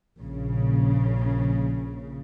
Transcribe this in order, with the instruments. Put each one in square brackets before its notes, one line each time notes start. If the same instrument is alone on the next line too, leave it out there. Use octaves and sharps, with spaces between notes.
[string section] A#1 C#3